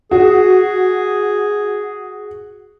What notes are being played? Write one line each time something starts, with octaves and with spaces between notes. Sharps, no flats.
F#4 G#4